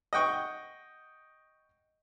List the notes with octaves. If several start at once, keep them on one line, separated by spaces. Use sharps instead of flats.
D#5 F#5 G5 C#6